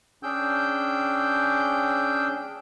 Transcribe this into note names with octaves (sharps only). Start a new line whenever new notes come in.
C#4 D4 G#4 G5 E6 G6